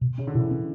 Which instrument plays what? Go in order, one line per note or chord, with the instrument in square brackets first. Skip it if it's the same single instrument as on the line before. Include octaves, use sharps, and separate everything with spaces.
[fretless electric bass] B2
[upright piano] C#3 [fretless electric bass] C#4
[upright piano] D3
[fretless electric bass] B2 [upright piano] E3
[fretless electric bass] C#4